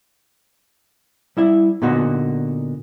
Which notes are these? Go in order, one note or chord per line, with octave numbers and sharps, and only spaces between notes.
G3 E4 E5
A#2 D3 B3 D#4 F#4